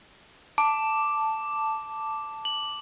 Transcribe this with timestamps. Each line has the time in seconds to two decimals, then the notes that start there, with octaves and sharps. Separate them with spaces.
0.58 A5 D6
2.45 F#7